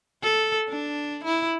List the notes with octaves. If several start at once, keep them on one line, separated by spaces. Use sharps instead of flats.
A4
D4
E4